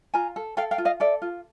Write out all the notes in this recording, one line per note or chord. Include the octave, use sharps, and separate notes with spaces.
F4 G#5 A#5
A4
A4 F5 G5
F5 G5
F4
D#5 F5
A4 D5 E5
F4